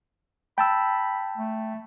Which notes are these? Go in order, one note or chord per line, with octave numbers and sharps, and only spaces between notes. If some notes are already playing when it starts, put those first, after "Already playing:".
G5 A5 B5 E6
A3